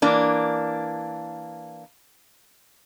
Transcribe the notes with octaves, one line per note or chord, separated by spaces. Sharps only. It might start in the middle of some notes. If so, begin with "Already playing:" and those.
E3 A#3 D4